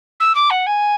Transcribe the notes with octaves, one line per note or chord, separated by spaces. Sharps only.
E6
D6
F#5
G#5